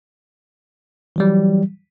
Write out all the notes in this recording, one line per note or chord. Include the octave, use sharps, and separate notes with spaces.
E3 F#3 G3